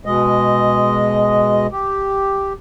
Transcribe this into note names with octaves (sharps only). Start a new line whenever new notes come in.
B2 G#3 D#5
G4